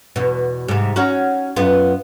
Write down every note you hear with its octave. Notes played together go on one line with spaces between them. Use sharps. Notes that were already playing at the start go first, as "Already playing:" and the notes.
E2 B2
G#2 C3
C#4 D#4 F#4
F#2 B3 F4